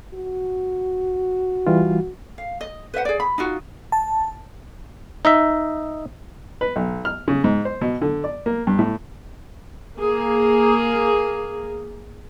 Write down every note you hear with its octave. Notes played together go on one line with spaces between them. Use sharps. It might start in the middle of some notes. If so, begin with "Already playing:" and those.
F#4
E3 G3 F4
F5
D#5
B4 C5 E5 F#5
G#4 D5
B5
D#4 F4 F#4
A5
D#4 D#5 E5
B4
B1
F6
C#3
G#2
C5
B2
D3
D5
A#3
G2
A2
A#3 G#4